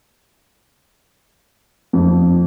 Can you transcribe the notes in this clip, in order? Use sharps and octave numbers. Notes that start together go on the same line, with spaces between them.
F2